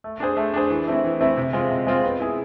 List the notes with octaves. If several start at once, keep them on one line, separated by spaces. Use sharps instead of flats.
A3
D4 G#4 C5
A3
D4 G#4 C5
E3
A3 C4 E4
E3
A3 C4 E4
C3
G#3 C4 F4
C3
G#3 C4 F4
B3
E4 G#4